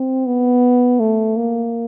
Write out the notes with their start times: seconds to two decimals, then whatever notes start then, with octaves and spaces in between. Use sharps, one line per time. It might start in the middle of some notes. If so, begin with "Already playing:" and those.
Already playing: C4
0.26 B3
1.00 A3
1.37 A#3